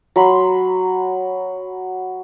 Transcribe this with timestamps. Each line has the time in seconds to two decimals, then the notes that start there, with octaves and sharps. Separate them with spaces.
0.16 F#3 B5 C6